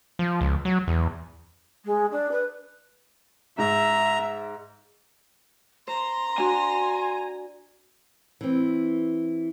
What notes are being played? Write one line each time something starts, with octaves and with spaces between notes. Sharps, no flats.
F3
C#2
F#3
E2
G#3
D4
B4
G#2 E5 A#5
C5 A#5 C6
D4 F#4 G#5
E3 C4